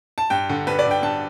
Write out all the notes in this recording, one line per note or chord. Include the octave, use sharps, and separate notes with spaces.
A5
G2 G5
D3
G2 B4
D5
D3
G5
G2 A5